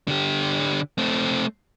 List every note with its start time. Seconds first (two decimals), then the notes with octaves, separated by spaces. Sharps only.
0.08 D3 G4
0.98 A3 C4